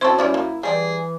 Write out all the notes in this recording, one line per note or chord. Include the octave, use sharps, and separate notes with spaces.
F#2 C4 E4 A4 C5 C6 C#6
G3 C#4 E4 D5
A#3
E3 G3 G#4 D5 G5